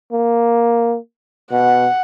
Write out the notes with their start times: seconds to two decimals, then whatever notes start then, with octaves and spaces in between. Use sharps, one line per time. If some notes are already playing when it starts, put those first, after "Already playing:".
0.12 A#3
1.51 B2 F#5